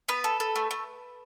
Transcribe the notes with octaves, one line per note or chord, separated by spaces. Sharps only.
B3 B4
A4
A4
A3
A3